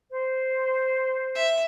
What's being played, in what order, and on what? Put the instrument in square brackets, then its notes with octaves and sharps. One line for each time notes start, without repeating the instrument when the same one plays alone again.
[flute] C5
[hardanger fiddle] E5